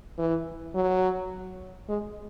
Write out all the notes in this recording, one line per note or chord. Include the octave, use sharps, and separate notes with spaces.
E3
F#3
G#3